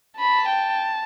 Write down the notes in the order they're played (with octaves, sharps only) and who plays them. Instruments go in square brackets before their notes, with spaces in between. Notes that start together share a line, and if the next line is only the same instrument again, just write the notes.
[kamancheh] A5 [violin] B5
[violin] G5